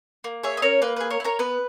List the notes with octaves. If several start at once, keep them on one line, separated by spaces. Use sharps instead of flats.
A#3
G#4 C#5 E5
D#5
C#4 A#4 C#5
A#3 B4
G#4 B4
A#4 C#5
E4
A#4 C#5
B3 B4